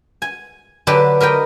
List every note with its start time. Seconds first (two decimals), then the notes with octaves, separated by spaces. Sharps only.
0.22 G#5
0.87 D3 F#3 D4 G4 B4
1.20 A#4 B4 D#5 G5